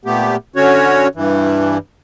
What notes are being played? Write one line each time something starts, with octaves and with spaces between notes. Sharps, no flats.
A#2 A3 B3 G4
D3 C#4 F#4 C#5
G2 E3